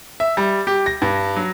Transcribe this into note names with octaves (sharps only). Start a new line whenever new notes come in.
E5
G3
G4
A#6
G2
F#3